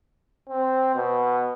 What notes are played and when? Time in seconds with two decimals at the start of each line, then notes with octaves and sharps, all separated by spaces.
0.49 C4
0.95 B2